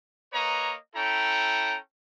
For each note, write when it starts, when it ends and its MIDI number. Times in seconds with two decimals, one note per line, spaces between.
0.33 0.75 58
0.33 0.75 71
0.33 0.75 73
0.33 0.75 75
0.33 0.75 82
0.96 1.77 61
0.96 1.77 64
0.96 1.77 69
0.96 1.77 79
0.96 1.77 82